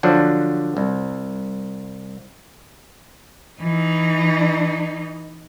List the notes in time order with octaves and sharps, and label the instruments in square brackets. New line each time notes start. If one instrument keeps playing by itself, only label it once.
[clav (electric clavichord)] D3 F3 F#3 D4
C2
[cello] E3 D#4